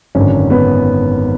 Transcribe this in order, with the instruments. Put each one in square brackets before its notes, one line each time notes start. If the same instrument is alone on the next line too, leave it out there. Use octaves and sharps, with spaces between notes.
[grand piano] G#1 F#2 D3 C#4
B3